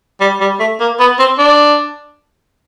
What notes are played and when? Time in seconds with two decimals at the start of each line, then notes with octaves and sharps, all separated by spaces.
0.21 G3
0.41 G3
0.60 A3
0.80 A#3
1.00 B3
1.19 C4
1.39 D4